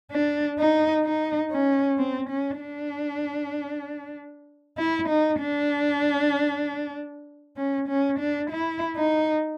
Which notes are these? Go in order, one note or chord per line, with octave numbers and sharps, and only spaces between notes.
D4
D#4
D#4
C#4
C4
C#4
D4
E4
D#4
D4
C#4
C#4
D4
E4
D#4